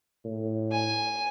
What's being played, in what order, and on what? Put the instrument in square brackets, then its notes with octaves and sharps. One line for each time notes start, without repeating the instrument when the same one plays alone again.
[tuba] A2
[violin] G#5